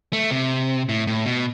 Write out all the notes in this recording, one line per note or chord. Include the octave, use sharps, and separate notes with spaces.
A3
C3
A2
A2
B2